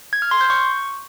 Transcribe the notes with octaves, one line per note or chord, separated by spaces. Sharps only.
G#6
F6
C6
G6
C#6